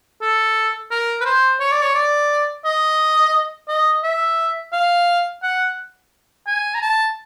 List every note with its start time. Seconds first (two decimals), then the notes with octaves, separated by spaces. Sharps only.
0.22 A4
0.91 A#4
1.21 B4
1.25 C5
1.60 C#5
1.72 D5
1.82 C#5
1.95 D5
2.65 D#5
3.69 D#5
4.04 E5
4.73 F5
5.43 F#5
6.47 G#5
6.75 A#5
6.82 A5